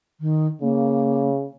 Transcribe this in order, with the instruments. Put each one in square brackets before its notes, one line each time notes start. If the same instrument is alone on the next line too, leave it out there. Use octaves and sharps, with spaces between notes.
[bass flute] D#3
[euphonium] C#3 [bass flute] A#3